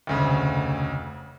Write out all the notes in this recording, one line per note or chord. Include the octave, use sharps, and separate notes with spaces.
F1 D2 C#3